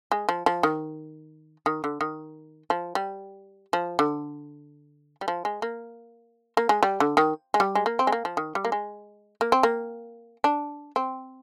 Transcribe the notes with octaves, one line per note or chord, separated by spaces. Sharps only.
G#3
F3
F3
D#3
D#3
D3
D#3
F3
G3
F3
D3
G3
F3
G#3
A#3
A#3
G#3
G3
D3
D#3
G#3
G3
G#3
A#3
C4
G#3
A#3
F3
D#3
G3
A#3
G#3
A#3
C4
A#3
D4
C4